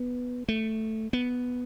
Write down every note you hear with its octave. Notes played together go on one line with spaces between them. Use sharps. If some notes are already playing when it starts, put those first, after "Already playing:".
Already playing: B3
A3
B3